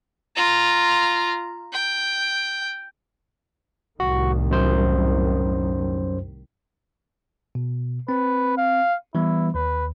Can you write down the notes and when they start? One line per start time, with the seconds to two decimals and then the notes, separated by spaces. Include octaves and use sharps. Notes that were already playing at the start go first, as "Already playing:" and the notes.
0.36 F4 A#5
1.73 G5
4.00 C2 A2 D#3 F#4
4.51 F#2 C5
7.55 B2
8.09 C4 B4
8.57 F5
9.15 E3 G3 B3 E4
9.55 D#2 B4